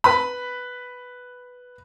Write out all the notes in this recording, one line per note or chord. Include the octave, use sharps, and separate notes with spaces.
B4 B5